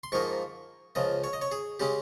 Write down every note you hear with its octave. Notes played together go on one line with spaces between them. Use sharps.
C6
G#2 F3 A#3 D#4 C#6
C#2 C#3 F3 D#5
C#5
D#5
C#5
G#4
C#3 G#3 C#4 G4